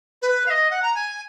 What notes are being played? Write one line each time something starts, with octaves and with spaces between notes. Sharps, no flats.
B4
F5
D#5
F#5
A#5
G#5